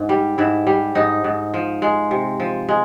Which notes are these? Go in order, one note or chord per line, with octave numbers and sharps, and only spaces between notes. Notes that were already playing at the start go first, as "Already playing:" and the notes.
Already playing: G#2
G3
G#2 E4
G3
G#2 D#4
G#2
F3
G#3
C3
F3
G#3